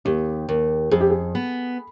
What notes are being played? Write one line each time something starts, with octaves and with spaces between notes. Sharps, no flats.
D#2 G4
D#2
F2 G#4
G4
G#4
B3